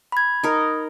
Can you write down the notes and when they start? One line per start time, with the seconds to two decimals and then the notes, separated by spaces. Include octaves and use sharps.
0.12 B5 G#6
0.43 D#4 A#4